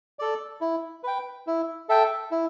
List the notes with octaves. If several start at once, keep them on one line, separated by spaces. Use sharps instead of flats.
A4 D5
E4
B4 G5
E4
A4 E5 G5
E4